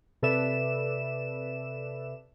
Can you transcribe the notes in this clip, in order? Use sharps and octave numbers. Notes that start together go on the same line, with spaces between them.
C3 A4 B4 D5 E5 E7